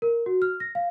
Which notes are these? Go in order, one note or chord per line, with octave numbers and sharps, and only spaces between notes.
A#4
F#4
F6
A#6
F5